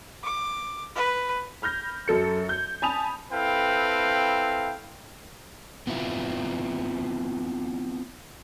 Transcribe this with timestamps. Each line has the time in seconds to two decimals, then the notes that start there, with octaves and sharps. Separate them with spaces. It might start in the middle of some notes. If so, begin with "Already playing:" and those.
0.24 D6
0.95 B4
1.62 B5 F6 G6 A#6
2.08 F#2 F#3 A4 C#7
2.49 G6
2.82 G#5 A5 B5 D#6 F7
3.32 C4 E4 A4 B4 F5 G5
5.87 B3 C4 E4 F4